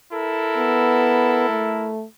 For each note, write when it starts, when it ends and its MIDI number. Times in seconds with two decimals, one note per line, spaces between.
0.13 1.92 64
0.13 1.92 69
0.13 1.92 70
0.57 1.44 59
1.49 2.04 57